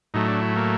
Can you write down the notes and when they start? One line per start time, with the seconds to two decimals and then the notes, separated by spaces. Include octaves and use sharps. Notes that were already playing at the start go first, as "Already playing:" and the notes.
0.14 A2 F#3 A3 D#4
0.28 D4
0.41 E4
0.56 A#3